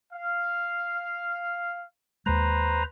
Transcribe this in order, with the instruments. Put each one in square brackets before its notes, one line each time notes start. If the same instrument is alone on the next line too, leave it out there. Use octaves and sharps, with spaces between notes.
[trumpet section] F5
[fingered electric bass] D#2 G#3 [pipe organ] B4 C5 A#5